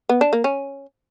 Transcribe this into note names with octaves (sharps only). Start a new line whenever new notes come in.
B3
D4
A#3
C#4